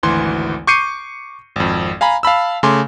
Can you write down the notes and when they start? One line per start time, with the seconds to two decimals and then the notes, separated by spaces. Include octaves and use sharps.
0.03 G#1 D2 E3 C6
0.67 C#6 D6 G6 C7 C#7 D#7
1.56 G#1 F2
2.01 F5 G#5 A#5 B5
2.23 F5 A5 B5 E6
2.63 C#3 A3 G#5 C6 D6